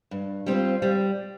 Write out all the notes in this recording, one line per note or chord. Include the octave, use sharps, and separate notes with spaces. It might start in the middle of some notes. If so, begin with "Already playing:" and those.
G2
G3 C4 F4 C5
G3